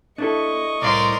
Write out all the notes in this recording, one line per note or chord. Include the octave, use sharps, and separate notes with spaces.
D4 E4 A4 D#5 C#6
C2 A2 A#4 C5 D5 F5 C6